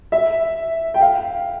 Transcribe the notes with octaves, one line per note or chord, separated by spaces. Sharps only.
E5
G5
F5